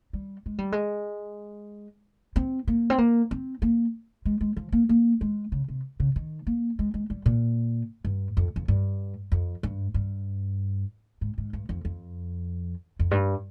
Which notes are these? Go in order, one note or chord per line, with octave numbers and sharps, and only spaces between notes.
G3
G#3
G3
G#3
C4
A#3
C4
A#3
C4
A#3
G#3
G#3
F3
A#3
A#3
G#3
C#3
C3
C#3
D#3
A#3
G#3
G#3
G3
A#2
G2
F2
F2
G2
F2
G2
G2
G#2
G#2
G2
F2
F2
F2
G2